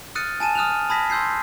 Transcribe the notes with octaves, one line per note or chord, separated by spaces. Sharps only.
D#6 F6 F#6 A6 C#7 D#7
G#5 A5 D#7 E7
D#6 F6 F#6 E7 F7
D#7
A5 B5 D#6 G#6 A#6 B6
C6 E6 G6 G#6 C7